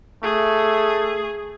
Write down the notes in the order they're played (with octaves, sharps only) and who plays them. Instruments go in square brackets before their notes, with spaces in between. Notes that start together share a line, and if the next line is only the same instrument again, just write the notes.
[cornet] A3 [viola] G#4